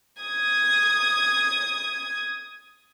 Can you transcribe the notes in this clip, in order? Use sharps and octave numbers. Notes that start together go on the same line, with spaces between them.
D#6 G#6